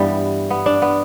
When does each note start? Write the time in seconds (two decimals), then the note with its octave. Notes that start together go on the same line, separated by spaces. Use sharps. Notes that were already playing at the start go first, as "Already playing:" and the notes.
Already playing: G2 E3 G3 B3
0.50 B3
0.66 D4
0.82 B3